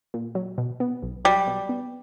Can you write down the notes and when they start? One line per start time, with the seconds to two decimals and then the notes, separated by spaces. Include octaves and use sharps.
0.14 A#2
0.35 F#3
0.58 B2
0.80 B3
1.02 B1
1.25 F#3 G3
1.47 B2
1.69 B3